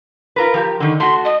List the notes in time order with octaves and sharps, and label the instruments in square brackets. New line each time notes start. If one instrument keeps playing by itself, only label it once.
[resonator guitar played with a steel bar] F4 A#4 B4
F3 G4 A#4
D3 D#3
[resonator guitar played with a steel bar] A3 F#4 [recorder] C6
[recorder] D#5